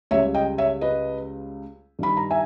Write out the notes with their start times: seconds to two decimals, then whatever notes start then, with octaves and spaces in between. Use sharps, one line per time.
0.11 C#2 C#3 G3 C#5 E5
0.34 D#5 G5
0.58 C#5 E5
0.81 B4 D#5
1.99 G2 D#3 G3 B5
2.17 A#5
2.31 E5 G#5